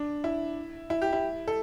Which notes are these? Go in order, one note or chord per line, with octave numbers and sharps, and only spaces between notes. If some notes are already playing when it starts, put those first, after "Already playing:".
Already playing: D4
E4
E4
G4
E4
A4